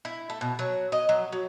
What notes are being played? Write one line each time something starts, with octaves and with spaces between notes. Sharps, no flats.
E4
A3
B2
F#3
D#5
F#3
F#3